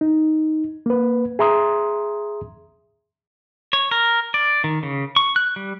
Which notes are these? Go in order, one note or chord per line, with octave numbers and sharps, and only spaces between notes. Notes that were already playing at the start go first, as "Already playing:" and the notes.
D#4
A#3 B4
G#4 E5 A#5 C6 D#6
C#5
A#4
D5
D#3
C#3
C#6
F#6
G3